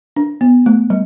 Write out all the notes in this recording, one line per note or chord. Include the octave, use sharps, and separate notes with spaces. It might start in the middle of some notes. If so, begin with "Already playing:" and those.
D4
B3
A3
G3